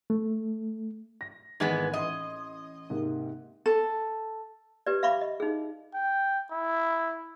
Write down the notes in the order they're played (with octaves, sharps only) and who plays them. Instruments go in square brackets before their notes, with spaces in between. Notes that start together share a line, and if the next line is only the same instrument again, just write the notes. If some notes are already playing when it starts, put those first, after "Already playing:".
[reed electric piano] A3
[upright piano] A#6
[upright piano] G#1 E2 G#6 [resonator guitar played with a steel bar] G#2 G#3 B3
[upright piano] A1 C6 [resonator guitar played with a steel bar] D#5
[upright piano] G#2 C3 A#3
[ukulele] A4
[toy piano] G4 B4 D5
E5 F5 B5 C#6 D6
D#5
D#4 G#4
[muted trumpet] G5
E4